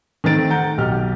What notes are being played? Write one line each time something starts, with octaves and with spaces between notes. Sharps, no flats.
D#3 A3 C4 A6 D7
F#5 A#5 G6
B1 G4 F6